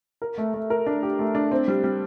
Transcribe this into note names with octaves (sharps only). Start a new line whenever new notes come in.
A#4
A3
A3
A#4
D4
G4
A3
D4
C4
G3
G3